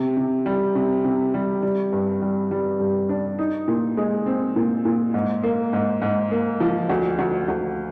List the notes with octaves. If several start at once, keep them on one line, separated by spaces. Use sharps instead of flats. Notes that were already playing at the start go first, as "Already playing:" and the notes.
Already playing: C3
C3
G3
C3
C3
G3
G3
G2
G3
G3
G2
D4
D#4
A#2
G#3
C4
A#2
A#2
G#2
A#3
G#2
G#2
A#3
F3
D2
D2
D2